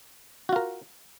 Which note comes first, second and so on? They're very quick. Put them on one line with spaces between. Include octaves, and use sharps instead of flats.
F#4 F4 A#4